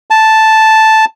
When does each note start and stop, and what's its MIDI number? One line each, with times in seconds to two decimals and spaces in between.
0.10 1.05 81